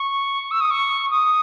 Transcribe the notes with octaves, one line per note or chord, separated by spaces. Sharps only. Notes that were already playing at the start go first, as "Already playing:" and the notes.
Already playing: C#6
E6
D#6
C#6
D#6